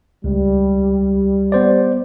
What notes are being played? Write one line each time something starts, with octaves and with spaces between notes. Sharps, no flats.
C#2 G3
B3 C5 D5